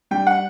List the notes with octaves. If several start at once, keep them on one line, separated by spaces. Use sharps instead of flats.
G3 G5
F#5